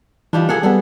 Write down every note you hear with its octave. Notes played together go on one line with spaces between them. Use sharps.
E3 F3 G3 D4 D#4
A#3 G#4 A4 F#5
G3 B3 G#4 A4